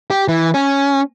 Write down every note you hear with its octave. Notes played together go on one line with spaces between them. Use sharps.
G4
E3
C#4